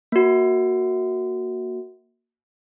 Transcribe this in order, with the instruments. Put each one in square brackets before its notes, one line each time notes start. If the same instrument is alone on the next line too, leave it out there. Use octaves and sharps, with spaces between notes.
[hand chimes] A#3 F#4